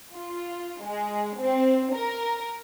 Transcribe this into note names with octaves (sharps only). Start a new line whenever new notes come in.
F4
G#3
C4
A#4